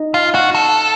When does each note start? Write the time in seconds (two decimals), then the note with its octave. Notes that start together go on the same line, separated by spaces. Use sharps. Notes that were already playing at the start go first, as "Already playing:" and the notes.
Already playing: D#4
0.14 F4
0.35 F#4
0.55 A4